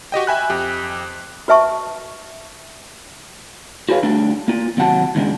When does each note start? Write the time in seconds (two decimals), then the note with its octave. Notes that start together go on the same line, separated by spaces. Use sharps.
0.12 F#4 G4 D#5 G5
0.27 E5 G5 G#5 B5 F#6
0.50 F2 G4
1.48 F#4 B4 E5 A5 C#6
3.89 F#4 G#4 B4 C#5 F5
4.03 D3 G3 A3 D4
4.48 A#3 F4
4.77 D#2 C3 F#3 F#5 A5
5.15 D#2 G#2 C#3 G#3 D4